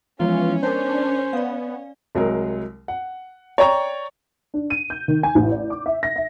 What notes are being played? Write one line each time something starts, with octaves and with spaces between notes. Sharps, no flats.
E3 F3 G#3 B3 C#4 F4
D4 A#4 C5 C#5
B3 D5 F5
C2 F#3 G#3 A#4
F#5
C#5 D5 G5 A#5 C#6
D4
D#7
G6
D#3
G#5
A1
D5
D6
E5
A#6
E5